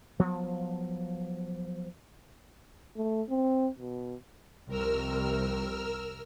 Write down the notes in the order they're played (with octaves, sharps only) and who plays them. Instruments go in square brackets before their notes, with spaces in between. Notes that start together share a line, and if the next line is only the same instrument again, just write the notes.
[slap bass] F3 F#3 B3
[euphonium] A3
C4
B2
[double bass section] C2 F2 C3 [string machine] A#4 E6 F6